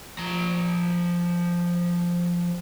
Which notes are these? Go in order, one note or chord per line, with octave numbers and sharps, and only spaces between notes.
F3 A#5